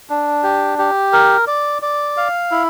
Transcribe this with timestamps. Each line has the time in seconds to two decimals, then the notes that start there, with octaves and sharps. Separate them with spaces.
0.10 D4
0.43 G4
0.78 G4
1.13 A#4
1.47 D5
1.82 D5
2.17 F5
2.51 E4